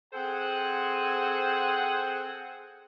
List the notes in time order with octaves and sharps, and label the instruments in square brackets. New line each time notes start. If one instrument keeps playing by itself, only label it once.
[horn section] C4 G#4 A4 C5 F#5 G#5